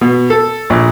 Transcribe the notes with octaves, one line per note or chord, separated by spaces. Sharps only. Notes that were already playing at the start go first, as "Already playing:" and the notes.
B2
A4
A#1